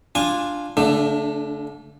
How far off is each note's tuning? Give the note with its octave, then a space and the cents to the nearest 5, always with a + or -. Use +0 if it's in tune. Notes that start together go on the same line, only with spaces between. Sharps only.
D4 +0 F4 +0 G#5 -20
D3 -35 A3 +20 D4 +15